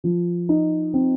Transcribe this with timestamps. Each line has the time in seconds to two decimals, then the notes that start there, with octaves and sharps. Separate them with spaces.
0.04 F3
0.49 D#4
0.94 C4